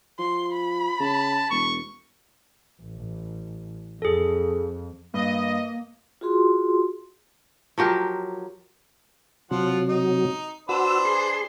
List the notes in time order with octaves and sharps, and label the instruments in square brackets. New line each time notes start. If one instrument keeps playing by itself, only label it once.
[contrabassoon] F3 [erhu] C6
[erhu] B5
[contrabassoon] C#3 [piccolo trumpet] A5
[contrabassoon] E1 [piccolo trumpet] C#6
[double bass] A1
[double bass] F2 [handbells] G#4 A4
[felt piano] G2 [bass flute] A#3 [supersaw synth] D#5
[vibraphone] F4 F#4 G#4 C6
[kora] F3 F#3 G4 A#4
[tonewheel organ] C3 F#3 [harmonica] F3 F4 F#5
[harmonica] D#4
[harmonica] D4 B4 C5 [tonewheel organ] F#4 E6
[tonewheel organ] G#4 C6